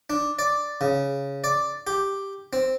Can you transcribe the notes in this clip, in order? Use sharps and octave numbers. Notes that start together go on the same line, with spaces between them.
D4
D5
C#3
D5
G4
C4